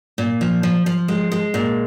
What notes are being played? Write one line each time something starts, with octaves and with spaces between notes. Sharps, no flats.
A#2
F3
F3
F3
G#3
G#3
A#2